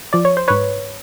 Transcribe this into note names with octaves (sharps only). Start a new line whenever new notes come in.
F3 D5
C#5
C5
G#2 B4 C#5